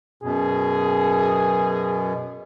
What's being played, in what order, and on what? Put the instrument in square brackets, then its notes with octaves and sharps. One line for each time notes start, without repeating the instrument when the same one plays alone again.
[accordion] F#2 B2 [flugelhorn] G#4